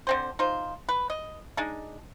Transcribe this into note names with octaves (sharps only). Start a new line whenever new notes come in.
D3 C4 C5
D#4 F4 C5
B4
D#5
G#3 D4 D#4